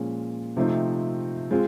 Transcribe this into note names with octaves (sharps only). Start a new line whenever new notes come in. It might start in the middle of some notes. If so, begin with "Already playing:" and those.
Already playing: A#2 F3 G#3 C#4
C3 F3 A3 C4 D#4
G#3 C4 F4